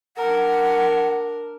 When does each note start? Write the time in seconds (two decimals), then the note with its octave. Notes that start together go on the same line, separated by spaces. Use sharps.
0.17 D4 A#4 F#5